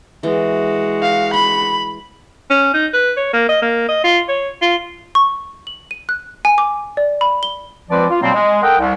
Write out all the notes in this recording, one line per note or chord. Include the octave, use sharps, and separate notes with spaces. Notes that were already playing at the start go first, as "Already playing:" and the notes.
E3 G#3 F#4
F5
B5 C6
C#4
D#4
B4
C#5
A#3
D#5
A#3
D#5
F4
C#5
F4
C#6
F#7
D#7
F#6
G#5
D6
D5
B5
G7
C#2 F3 C4 B4 C5 D5
F4
B2 F#3 G3 A#3 C4
G#3
A4 A#4 D#5 F#5 G5
C2